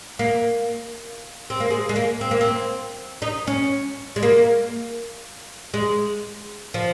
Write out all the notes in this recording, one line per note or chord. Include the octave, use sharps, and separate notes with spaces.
A#3
C4
A#3
G#3
G#3
A#3
C4
A#3
C4
D#4
C#4
G#3
A#3
G#3
F3